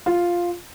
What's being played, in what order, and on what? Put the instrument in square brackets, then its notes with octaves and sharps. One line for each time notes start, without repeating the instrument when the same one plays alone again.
[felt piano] F4